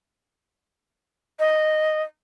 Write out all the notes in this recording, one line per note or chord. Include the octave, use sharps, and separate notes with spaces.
D#5